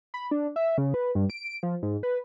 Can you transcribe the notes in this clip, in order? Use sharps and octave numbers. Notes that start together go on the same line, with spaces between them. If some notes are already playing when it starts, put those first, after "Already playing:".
B5
D4
E5
C#3
B4
G2
D7
F3
G#2
B4